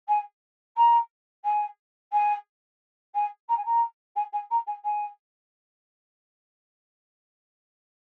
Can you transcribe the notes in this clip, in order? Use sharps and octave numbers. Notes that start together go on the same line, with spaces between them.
G#5
A#5
G#5
G#5
G#5
A#5
G#5
A#5
G#5
G#5
A#5
G#5
G#5